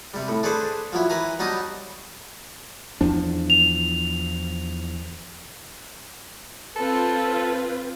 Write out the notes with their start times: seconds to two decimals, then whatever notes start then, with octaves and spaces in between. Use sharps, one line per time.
0.14 C3 G3
0.28 A2
0.43 D4 G#4 A4 B4 C5
0.93 F3 F#3 E4
1.10 E3 B4 G#5 A#5
1.39 F#3 G3 D#4 D#5 A5 D#6
3.01 E2 F3 D4
3.50 F7
6.76 C4 F4 A4 B4